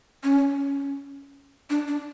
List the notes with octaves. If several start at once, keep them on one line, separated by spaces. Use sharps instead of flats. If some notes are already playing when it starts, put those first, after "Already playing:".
C#4
C#4
D4
D4